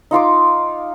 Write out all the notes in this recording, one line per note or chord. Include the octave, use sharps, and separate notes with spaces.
D#4 F4 C6 D6